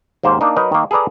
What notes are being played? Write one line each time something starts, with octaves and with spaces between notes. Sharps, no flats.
D#2 G#2 A#3 C5 F5
A#3 D4 D#4
F#3 D#4 A#4 B4
D#3 A#3
G#4 A4 B4 D5 A#5